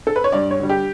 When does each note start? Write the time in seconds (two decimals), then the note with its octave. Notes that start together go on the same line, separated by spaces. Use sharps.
0.07 A4
0.16 B4
0.24 C#5
0.32 G2 D5
0.51 C#5
0.60 D3 G3
0.69 G4